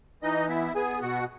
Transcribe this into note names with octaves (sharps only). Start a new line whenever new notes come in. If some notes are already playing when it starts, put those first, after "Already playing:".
E3 D#4 D#5
B3 E4 E5
B3 G#4 G#5
B2 F#4 F#5